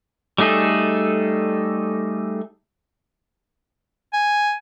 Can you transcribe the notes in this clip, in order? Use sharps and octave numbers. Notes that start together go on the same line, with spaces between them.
G3 A3 D#4 G#4 A4
G#5